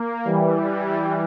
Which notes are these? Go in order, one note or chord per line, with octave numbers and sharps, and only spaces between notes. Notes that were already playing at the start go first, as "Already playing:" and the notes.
Already playing: A#3
E3 G3